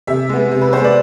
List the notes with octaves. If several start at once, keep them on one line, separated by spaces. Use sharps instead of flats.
C3 E5
G#3 B3
C3
B4
G#3 B3 C5
D5